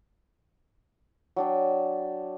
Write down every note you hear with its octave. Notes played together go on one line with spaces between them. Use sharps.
F#3 D4 G5